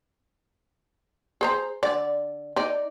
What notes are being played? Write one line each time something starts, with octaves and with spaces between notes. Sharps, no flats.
G#4 C5 A#5
D3 D5
D#4 D5